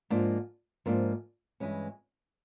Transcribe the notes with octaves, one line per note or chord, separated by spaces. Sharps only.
G#2 F3 A#3 D4
G#2 F3 A#3 D4
G2 E3 G#3 C#4